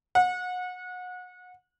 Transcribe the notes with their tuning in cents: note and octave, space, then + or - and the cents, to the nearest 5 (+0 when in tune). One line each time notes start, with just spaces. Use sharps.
F#5 -30